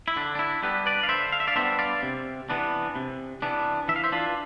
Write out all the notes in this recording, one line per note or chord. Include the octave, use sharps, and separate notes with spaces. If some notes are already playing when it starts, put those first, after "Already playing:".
E4
D3 D4
D4
E4
G3 B3 D4 G4 B4
B4 D5
F5
D3 C5 E5
F5
E5
D5 F5
G3 B3 D4 C5 E5
D5 F5
C3
E3 B3 D4
C3
E3 B3 D4
E3 E5
F5
C5 E5
D4 F4